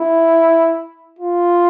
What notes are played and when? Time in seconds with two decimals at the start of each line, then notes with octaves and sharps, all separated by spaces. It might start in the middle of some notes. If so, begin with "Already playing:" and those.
Already playing: E4
1.19 F4